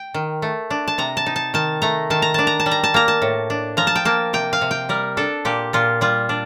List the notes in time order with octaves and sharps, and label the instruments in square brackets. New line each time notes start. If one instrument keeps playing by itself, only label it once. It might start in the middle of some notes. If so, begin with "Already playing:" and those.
Already playing: [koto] G5
D#3
A3
D4
A5
C3 A#5
A5
D#4
A5
D#3 A5
A3 A#5
D#3 A5
A#5
D4 A5
A#5
A5
G3
A#5
A5
A#3 A#5
A5
A2
D4
F3 A#5
A5
G5
A#3 A5
C3 G5
F5
C3
G5
G3 A#4
D4 A4
A#2 G4
A#2 F4
G3 F4
D4